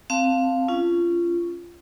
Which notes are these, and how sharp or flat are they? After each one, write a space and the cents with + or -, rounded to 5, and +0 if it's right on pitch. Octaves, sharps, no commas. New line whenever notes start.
C4 +0 F5 +0 A5 +10
C#4 +0 F4 -25